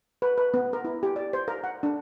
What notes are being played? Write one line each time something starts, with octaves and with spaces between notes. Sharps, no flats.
B4
B4
B3
A#4
E4
G4
D5
C5
A#4
F#5
D4